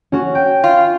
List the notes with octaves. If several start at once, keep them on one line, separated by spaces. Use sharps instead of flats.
C#4 F#4
G5 G6
F4